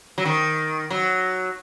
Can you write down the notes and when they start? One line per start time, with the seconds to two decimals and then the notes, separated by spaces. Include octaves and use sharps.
0.18 F#3
0.25 D#3
0.90 F#3